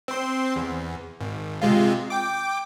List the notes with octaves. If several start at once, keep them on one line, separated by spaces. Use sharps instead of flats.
C4 C6
E2
G#1
C3 G#3 F4
G5 D6